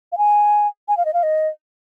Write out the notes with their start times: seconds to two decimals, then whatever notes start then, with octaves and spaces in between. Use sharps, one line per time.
0.12 F5
0.18 G#5
0.88 G#5
0.97 F5
1.05 D#5
1.14 F5
1.23 D#5